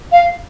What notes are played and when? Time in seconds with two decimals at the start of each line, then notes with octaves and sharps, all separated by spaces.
0.12 F5